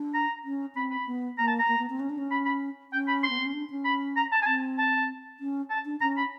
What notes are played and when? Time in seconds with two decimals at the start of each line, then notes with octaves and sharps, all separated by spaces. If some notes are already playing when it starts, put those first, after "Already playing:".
Already playing: D4
0.14 A#5
0.44 C#4
0.75 C4 B5
0.91 B5
1.07 B3
1.38 A#3 A#5
1.47 A5
1.59 A#5
1.68 A#3
1.79 B3
1.90 C4
2.00 C#4
2.10 D4
2.18 C#4
2.31 B5
2.45 B5
2.92 C#4 G5
3.08 B5
3.23 C6
3.30 B3
3.39 C4
3.46 C#4
3.53 D4
3.70 C#4
3.85 B5
4.16 A#5
4.32 A5
4.42 G#5
4.46 C4 A5
4.78 A5
5.40 C#4
5.70 A5
5.85 D4
6.01 C#4 A#5
6.17 B5